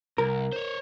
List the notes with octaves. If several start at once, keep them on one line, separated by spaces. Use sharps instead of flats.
C2 A#4
C5 C#5